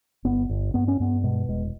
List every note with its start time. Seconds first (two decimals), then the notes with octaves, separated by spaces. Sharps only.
0.25 G1 B3
0.49 G1
0.74 G2 B3
0.88 C#4
1.00 G2 B3
1.24 B2 G#3
1.48 E1 G#3